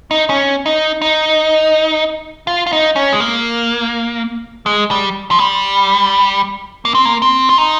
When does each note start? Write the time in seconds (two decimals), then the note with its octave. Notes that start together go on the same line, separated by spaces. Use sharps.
0.11 D#4
0.29 C#4
0.66 D#4
1.02 D#4
2.47 F4
2.66 F4
2.73 D#4
2.96 C#4
3.13 G#3
3.20 A#3
4.66 G#3
4.91 G3
5.31 F3
5.39 G3
6.85 A#3
6.95 C4
7.05 A#3
7.22 C4
7.49 F4
7.58 D#4